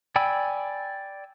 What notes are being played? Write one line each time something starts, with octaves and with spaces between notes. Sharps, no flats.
D5 G5 G#5 B5 E6